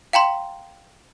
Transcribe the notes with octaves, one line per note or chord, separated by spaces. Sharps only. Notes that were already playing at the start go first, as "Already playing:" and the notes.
F5 G5 A#5 C6